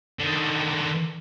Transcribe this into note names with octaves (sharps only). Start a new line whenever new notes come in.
D3 D#3